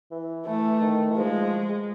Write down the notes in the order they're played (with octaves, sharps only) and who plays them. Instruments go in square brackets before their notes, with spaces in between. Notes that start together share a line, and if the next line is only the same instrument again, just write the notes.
[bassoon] E3
[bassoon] E3 [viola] A3
[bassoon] D#3
E3
[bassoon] F3 [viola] G#3